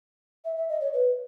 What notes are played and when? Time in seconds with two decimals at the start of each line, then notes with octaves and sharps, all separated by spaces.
0.45 E5
0.57 E5
0.69 D#5
0.81 C#5
0.93 B4